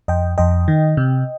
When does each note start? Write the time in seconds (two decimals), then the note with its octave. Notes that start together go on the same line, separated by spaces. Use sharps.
0.08 F2 D#5 G5
0.38 F2 D#5 G5
0.68 D#3
0.97 C3